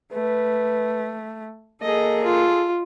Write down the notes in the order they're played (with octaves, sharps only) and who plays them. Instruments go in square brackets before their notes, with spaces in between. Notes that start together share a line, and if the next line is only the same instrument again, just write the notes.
[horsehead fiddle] A3 [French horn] B4
[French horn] A#3 [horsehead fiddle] G#4 A4 [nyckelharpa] D#5
[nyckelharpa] F4